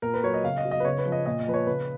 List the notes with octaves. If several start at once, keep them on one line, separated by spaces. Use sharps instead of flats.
A#2 A#4
B4
F#3 C#5
D#5
C#3 F5
D#5
F#3
D#5
B4
C#3 C#5
B4
F3
D#5
A#2 D#5
D#5
F3 B4
C#5
C#3 B4